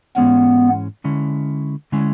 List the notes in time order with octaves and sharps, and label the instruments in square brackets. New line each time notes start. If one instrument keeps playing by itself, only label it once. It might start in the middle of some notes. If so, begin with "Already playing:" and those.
[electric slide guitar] G#2 E3 G#3 C#4 [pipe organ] B3
[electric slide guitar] D3 G#3 C#4 E4
D3 G#3 C#4 E4